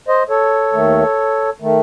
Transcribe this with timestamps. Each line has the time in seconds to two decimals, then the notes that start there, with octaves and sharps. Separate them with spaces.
0.08 C5 D#5
0.29 A4 C#5
0.73 D#2 D#3 A3
1.60 D#3 A3